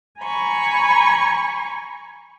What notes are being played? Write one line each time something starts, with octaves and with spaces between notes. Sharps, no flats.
G#5 A#5 B5 C#6